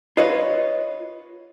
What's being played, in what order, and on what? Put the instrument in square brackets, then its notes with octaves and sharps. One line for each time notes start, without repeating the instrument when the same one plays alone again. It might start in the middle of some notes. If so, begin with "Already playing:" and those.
[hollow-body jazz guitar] F4 B4 C#5 [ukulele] D#5